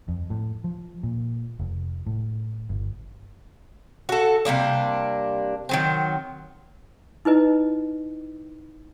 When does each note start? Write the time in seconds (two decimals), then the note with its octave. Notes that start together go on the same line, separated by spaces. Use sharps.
0.08 F2
0.30 A2
0.64 F3
1.03 A#2
1.59 F1
2.06 A2
2.70 G1
4.09 F#4 A4
4.45 C3 G3 A#3 D4
5.69 D#3 F#3 C4
7.25 D#4 E4 B4 D#5